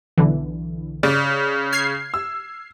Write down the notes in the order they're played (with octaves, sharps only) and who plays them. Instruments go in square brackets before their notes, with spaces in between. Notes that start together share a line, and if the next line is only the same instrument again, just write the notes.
[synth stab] B1 D3 E3
[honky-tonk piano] C#3 [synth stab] D5
[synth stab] F6 G#6 C7
[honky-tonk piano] E6